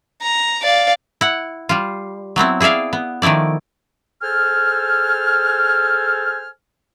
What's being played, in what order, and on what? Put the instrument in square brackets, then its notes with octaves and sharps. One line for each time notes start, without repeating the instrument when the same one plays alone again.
[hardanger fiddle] A#5
D5 F5
[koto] E4 F#5
G3 F4
F#3 B3 C4 E4
E4 G#4 D5 E5 F5
B3
D#3 F3 A3 E4 D5
[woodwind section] G#4 A4 C5 G#5 F6